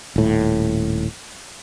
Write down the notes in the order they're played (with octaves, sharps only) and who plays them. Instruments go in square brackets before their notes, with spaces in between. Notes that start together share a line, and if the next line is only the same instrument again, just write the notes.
[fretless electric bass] D#1 A2